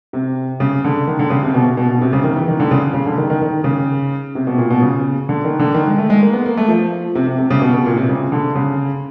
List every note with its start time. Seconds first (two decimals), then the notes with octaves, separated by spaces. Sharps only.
0.13 C3
0.60 C#3
0.84 D3
1.07 D#3
1.19 D3
1.30 C#3
1.43 C3
1.54 B2
1.77 B2
1.89 B2
2.01 C3
2.13 C#3
2.24 D#3
2.36 E3
2.48 D#3
2.60 D3
2.71 C#3
2.94 C#3
3.06 D3
3.18 D#3
3.30 D#3
3.41 D#3
3.64 C#3
4.35 C3
4.47 B2
4.58 A#2
4.70 B2
4.82 C#3
5.29 D3
5.44 D#3
5.59 D3
5.74 D#3
5.87 G#3
5.98 A3
6.10 G#3
6.22 A#3
6.33 B3
6.46 A#3
6.57 A3
6.68 F3
7.15 C3
7.27 C3
7.39 C3
7.50 C#3
7.62 B2
7.74 B2
7.86 A#2
7.97 C3
8.09 C#3
8.32 D3
8.55 C#3